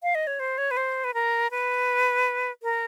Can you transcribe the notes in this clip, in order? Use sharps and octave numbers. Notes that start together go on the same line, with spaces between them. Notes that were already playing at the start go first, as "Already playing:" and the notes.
F5
D#5
C#5
C5
C#5
B4
C5
B4
A#4
B4
A#4